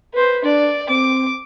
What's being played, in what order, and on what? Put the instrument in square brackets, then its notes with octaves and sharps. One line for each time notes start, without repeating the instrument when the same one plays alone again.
[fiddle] B4 C5
[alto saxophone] D4 [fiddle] D5
[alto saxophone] C4 [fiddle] D6